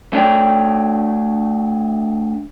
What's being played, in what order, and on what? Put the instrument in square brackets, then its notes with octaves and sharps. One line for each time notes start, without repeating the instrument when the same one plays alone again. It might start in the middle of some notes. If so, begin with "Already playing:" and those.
[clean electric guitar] A3 D4 C#5 D5 G5